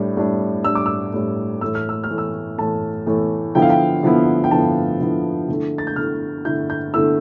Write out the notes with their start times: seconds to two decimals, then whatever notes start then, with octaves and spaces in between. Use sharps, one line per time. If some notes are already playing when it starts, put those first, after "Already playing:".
Already playing: A2 G3 D4
0.17 A2 G3 D4
0.65 A2 G3 D4 E6
0.75 D6
0.86 E6
1.13 A2 G3 D4
1.61 A2 E3 A3 E6
1.75 F6
1.89 E6
2.04 F6
2.10 A2 E3 A3
2.18 E6
2.59 A2 E3 A3 A5
3.06 A2 E3 A3
3.55 D3 F3 B3 E4 G5
3.62 F5
3.70 G5
4.03 D3 F3 B3 E4
4.44 G5
4.51 D3 F3 B3 E4 A5
5.01 D3 F3 B3 E4
5.48 D3 A3 E4
5.78 A6
5.87 G6
5.96 D3 A3 E4 F6
6.45 D3 A3 E4 G6
6.70 G6
6.94 D3 A3 E4 E6